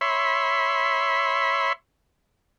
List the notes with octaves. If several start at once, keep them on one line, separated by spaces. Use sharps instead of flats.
C#5 E5 B5 C6